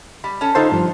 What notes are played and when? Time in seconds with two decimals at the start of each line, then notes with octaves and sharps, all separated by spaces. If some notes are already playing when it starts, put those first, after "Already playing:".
0.24 G3 B5
0.41 C#4 A4
0.55 D3 D#4 F4 A4 C5
0.72 G2 F3